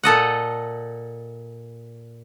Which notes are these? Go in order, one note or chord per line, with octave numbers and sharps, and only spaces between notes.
A#2 A4 D#5 F#5